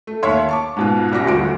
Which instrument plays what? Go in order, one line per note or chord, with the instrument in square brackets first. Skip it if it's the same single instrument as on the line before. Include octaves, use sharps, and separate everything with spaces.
[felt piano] A3
D#2 C#5 E5 C6
A5 C#6 D6
G#2 B2 F4
C2 G3 C#4 D6 A#6
D#1 D2 F#4 D7